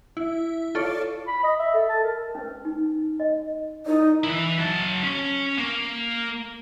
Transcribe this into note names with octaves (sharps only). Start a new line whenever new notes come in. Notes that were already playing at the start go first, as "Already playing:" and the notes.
E4
F4 A4 C#5 D5
B5
D#5
E5
A4
A5
A#4
C#4 B4
D#4
D#5
D#4 E4 A#4 D5
E3 E4
F#3 A5
C#4
A#3